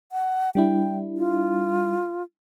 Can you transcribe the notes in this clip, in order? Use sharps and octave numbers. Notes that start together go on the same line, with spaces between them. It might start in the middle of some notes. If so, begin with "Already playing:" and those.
F#5
G3 D4 E4 G5
F4